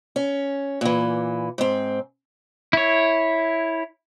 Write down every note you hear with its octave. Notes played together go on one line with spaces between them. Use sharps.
C#4
A#2 E3
G#2 C4
E4 C#5